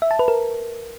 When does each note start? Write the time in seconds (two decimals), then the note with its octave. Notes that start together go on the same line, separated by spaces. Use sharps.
0.02 E5
0.11 A5
0.19 B4
0.28 A#4